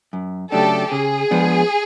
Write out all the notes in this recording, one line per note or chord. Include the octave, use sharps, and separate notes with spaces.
F#2
C#3 F#3 A3 D4 G4 A4
C#3 G#4
F3 G#3 B3 D4